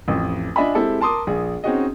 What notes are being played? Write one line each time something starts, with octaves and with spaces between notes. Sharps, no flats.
A1 F2
D4 F4 D#5 E5 G#5 B5
G#3 C4 E4 G4 A4
A#4 A5 C6 D6 D#6
A#1 G#4
C4 C#4 D#4 F#4 G#4 D#5